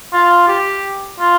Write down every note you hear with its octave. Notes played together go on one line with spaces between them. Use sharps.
F4
G4
F4